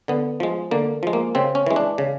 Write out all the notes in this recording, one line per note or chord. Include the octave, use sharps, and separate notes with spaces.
D3 B3
F3 G#3
D3 A#3
F3 G#3
A#3
C#3 C4
C#4
E3 G#3
D4
C#3